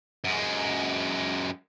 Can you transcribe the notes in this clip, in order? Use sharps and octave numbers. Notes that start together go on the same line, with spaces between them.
F#2 G#3